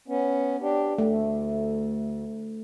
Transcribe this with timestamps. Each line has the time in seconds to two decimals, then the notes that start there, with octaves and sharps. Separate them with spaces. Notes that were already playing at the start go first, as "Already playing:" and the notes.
0.08 B3 C#4
0.61 D4 G4
0.98 D2 A3